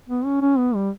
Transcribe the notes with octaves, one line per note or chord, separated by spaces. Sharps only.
B3
C#4
C#4
B3
G3